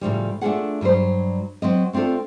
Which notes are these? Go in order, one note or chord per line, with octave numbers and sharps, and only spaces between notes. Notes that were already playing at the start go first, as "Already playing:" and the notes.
A2 C#3 F3 G3
A3 D4 D#4 F4 G#4 F#5
G2 F#3 G3 C5
F#3 C4 D#5
A3 C4 D4 F4 A4